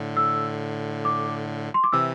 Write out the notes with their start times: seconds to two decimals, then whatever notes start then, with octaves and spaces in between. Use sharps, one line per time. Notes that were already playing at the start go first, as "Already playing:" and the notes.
Already playing: A2 D3
0.17 E6
1.05 D6
1.74 C6
1.84 D6
1.92 C3 E3 E6